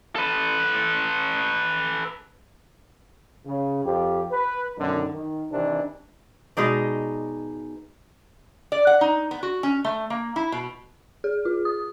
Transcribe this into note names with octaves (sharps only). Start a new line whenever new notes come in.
A4 B4
C#3
F2 G4
B4
F#2 B2 D3 D#3
D#3
C3 D#3 E3 C4 D4
B2 G#3 D#4 D5
D5
F#5
D#4
B3
F#4
C#4
A3
A#3
E4
B2
G#4
F4
D#6